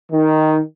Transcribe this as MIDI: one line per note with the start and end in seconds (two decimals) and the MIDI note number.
0.12 0.59 51